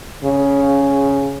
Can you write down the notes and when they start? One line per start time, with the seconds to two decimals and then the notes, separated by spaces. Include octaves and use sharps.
0.25 C#3